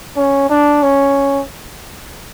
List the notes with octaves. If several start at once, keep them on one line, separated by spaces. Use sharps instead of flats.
C#4
D4
C#4